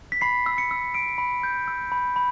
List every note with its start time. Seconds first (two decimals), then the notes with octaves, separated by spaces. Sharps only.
0.12 B6
0.21 B5 C7
0.46 E6
0.58 C#7
0.71 E6
0.94 E6 D7
1.18 B5
1.43 G6
1.68 E6
1.92 B5
2.16 B5